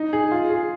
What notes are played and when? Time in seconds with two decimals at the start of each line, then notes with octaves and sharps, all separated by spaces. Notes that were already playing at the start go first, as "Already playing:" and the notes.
Already playing: D#4
0.13 G#4
0.31 F4
0.50 G#4